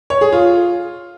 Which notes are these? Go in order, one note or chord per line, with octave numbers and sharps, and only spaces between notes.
C#5
G#4
F4